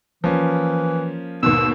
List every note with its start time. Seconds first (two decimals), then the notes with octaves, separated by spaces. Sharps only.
0.24 E3 F3 A#3 C#4
1.43 D#2 G#2 B2 E6